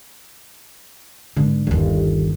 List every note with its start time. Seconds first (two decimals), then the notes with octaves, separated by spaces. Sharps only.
1.36 G#1 D3
1.67 G1 D#2